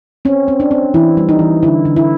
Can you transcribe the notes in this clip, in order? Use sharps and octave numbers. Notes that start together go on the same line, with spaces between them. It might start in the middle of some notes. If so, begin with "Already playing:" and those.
C4 C#4
C4
D4
C4
E3 E4
G3
D#4
E3
D3 E4
D3
E4